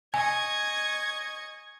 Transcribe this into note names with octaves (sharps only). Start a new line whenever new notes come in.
D#5 G#5 C#6 G#6